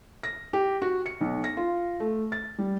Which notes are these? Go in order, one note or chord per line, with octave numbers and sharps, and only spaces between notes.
A#6
G4
F#4
C#7
B1
A#6
F4
A3
A6
G3